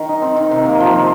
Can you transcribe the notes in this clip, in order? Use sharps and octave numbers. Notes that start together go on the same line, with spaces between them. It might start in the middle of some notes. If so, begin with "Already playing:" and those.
Already playing: D#3
D#4
C4
D#3
C3
A#3
F3
C5